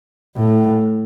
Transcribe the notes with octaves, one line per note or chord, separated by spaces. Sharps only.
A2